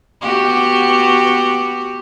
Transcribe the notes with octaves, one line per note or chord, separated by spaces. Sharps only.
B3 F#4 G4